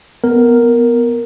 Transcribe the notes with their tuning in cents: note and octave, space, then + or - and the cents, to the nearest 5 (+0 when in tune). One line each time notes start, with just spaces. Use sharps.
B3 +0 A#4 +0